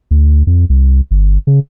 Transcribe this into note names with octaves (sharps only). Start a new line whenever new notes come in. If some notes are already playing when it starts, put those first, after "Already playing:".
D2
F2
C2
G1
C#3